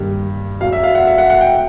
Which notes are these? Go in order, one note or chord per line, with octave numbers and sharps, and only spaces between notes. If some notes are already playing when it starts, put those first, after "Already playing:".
Already playing: G2 D#3 G3 A#3
E2 B2 F#3 F5
E5
F5
F#5
E5
F#5
F#5
G5